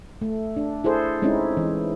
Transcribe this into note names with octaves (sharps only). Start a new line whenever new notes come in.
A3
D4
E4 G#4 A4 C5
G#3 C4 C#4 D#4 E4
E3